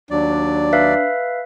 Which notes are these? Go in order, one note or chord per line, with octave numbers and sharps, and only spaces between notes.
D#2 F#3 D4 D5
B4 E5 F5